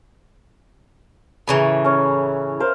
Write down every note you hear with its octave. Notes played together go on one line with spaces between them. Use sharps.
A2 C#3 E3 E5 A#5 B5
C#4 C#5
A#4 C5 F5